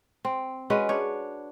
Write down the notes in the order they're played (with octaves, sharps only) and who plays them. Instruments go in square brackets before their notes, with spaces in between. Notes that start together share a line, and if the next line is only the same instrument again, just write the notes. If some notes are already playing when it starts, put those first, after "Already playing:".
[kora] C4
G#3 C#4 F#4 B4
D4 C#5